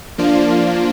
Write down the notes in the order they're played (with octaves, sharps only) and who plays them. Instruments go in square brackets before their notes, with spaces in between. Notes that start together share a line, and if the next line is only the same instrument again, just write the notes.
[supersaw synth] F3 A#3 D4 F4